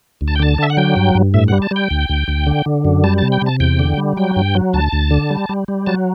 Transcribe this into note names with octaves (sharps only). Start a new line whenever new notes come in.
D2
A5
G5
D3 A5
D3 E5
F#5
F#3 G5
G2
G2
A2 E5
G3 F#5
A5
G3 G5
D2
D2
D2
D3
D3
F#2
G3 A5
C3 A5
G5
C3 A5
E2 G5
D3
G3
F#3 G5
G2
F#3
D2 A5
D2
D3
G3
G3
G3
F#3 A5